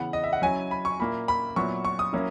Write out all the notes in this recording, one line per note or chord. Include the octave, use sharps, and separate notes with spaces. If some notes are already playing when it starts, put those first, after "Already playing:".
Already playing: C#3 E3 B3 F#5
D#5
E5
F#5
F#3 C#4 E4 G#5
B5
C#6
A#2 A#3 E4 B5
B5
A#2 F#3 B3 E4 C#6
C#6
D#6
F#3 A#3 C#4 E4